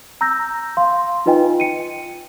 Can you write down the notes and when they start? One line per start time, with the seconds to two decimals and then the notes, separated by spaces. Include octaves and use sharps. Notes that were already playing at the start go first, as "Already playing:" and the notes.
0.21 A#5 E6 G6 A#6
0.77 F5 C6
1.26 D#4 F4 B4 D#5 G5 G#5
1.60 C#7 D#7